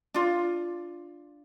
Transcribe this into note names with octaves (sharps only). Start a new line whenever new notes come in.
D4 F4